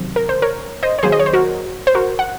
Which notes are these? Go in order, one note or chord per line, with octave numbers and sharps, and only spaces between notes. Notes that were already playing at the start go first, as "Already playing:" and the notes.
Already playing: C3 D#3 F#3 C4
A#4
C5
A#4 C#5
C5 D#5
C#5
D#3 F#3 A#3 G#4 C5
D#5
C#5
C5
F#4 A#4
C5
F#4 A#4
F#5